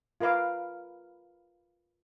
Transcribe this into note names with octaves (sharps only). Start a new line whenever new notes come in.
F4 A#4 B4 F5 D6